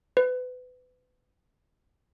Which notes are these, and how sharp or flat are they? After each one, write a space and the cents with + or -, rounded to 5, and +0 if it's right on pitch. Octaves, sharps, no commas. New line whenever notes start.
B4 +30